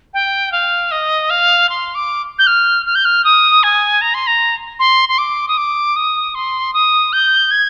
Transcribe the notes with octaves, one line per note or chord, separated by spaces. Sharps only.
G5
F5
D#5
F5
C6
D6
G6
F6
F6
G6
F6
D#6
G#5
A#5
C6
A#5
C6
C6
D6
D#6
D6
D#6
C6
D#6
G6
G#6